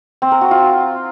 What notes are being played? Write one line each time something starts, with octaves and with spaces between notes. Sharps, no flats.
C4
A#4
F#4
F4